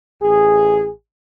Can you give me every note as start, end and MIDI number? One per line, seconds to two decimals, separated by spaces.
0.23 0.90 33
0.23 0.90 68